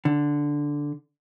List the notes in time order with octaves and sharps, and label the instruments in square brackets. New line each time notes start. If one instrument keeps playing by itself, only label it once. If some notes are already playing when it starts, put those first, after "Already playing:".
[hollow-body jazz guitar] D3